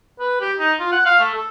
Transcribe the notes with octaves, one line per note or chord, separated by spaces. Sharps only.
B4
G4
D#4
F4
F#5
F5
A3
A4